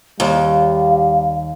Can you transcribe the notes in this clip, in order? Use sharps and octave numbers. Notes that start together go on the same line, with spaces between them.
D#2 G3 F5